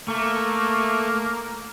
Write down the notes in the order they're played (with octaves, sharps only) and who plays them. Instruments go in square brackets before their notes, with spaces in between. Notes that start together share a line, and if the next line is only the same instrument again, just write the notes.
[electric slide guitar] A3 [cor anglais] A#3